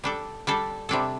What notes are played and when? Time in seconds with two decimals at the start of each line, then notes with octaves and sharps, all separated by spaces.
0.04 G3 D4 A4
0.47 G3 D4 A4
0.89 C3 G3 D4 A4